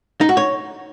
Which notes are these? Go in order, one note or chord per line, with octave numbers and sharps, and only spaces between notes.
D#4
F#4
C#5